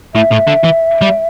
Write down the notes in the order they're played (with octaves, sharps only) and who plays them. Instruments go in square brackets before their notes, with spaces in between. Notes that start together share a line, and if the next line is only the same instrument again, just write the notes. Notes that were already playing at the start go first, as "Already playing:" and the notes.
[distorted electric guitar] A2 [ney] E5
[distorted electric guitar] A2
D3
E3
G3